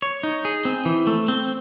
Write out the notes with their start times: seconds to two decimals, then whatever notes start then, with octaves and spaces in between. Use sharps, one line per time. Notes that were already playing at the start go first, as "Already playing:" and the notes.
0.02 C#5
0.23 D#4
0.45 G#4
0.65 C4
0.85 E3
1.07 A3
1.28 C4